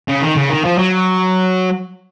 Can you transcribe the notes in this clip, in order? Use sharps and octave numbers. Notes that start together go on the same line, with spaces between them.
C#3
D#3
C#3
D#3
F3
F#3